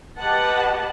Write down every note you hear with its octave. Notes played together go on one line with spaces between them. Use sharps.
G4 B4 D#5 F#5 A5